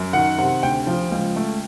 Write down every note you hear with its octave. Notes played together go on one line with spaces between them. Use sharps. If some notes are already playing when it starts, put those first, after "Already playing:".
Already playing: F#2
D#3 F#5
C3 F#5
D2 G5
F3
C#2
A3